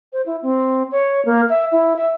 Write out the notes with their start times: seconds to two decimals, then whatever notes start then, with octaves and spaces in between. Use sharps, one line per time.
0.13 C5
0.26 E4
0.42 C4
0.92 C#5
1.25 A#3
1.49 E5
1.72 E4
1.96 E5